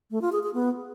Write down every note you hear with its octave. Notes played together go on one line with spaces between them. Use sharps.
A3
F4
G#4
G#4
B3